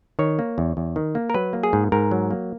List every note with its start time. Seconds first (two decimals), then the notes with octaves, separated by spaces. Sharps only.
0.19 D#3 C#5
0.39 A#3
0.58 E2
0.77 E2
0.96 D#3
1.15 A#3
1.30 A#4
1.34 F#3 B4
1.53 A#3
1.63 G#4
1.73 G#2
1.92 G#2 A#4
2.11 F#3
2.31 A#3